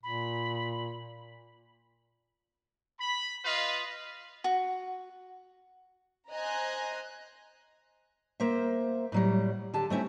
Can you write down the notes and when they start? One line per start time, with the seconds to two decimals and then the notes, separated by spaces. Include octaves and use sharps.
0.03 A#2 B5
3.00 B5
3.45 F4 B4 D#5 F5
4.44 F#4
6.32 C5 D#5 G#5 A#5 F#6 A#6
8.40 A#3 C5 E5
9.12 A2 F#3 G3
9.74 D3 G4 A5
9.90 A3 C4 C#4 E4